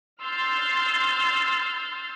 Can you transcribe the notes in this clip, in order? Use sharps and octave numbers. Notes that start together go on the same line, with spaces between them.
C6 E6 F6 G6 A6 C7